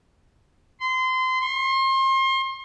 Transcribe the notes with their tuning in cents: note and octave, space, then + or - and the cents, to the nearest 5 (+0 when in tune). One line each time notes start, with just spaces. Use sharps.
C6 -25
C6 +35